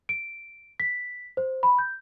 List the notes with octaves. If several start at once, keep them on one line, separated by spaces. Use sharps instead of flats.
D7
B6
C5
B5
G6